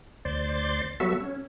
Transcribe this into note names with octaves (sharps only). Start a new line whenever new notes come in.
D2 C5 D5 C6 A6
F#3 G3 B3 F#4 A4 E5
C#4